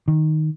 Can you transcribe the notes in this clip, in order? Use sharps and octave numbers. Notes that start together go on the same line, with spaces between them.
D#3